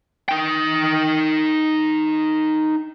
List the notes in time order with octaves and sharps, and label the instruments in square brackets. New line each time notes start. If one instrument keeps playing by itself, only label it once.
[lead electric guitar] D#4 G5